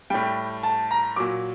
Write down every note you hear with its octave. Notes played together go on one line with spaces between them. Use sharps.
A2 G3 G5
A5
A#5
A#2 F#3 D6